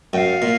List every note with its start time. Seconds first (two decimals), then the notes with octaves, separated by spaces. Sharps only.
0.13 F#2 F5 G5
0.42 A#2